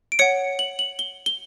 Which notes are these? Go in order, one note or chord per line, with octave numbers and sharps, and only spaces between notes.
D7
C#5 F#5 C#7
F#7
F#7
G7
G7